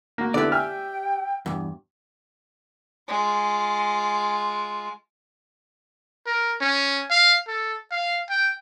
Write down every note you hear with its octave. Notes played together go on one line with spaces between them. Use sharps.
A#3 F#4
D3 B3 E4 G4 A4 D5
E5 G5 G#5 F6
E2 G2
G#3 F4
A#4
C#4
F5
A4
F5
G5